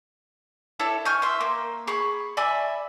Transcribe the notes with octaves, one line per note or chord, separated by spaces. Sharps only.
E4 A4 C#5 D5
G#5 C#6 F6 G6
E5 C6
A#3
G#4 B5 C#6
D5 E5 G#5 B5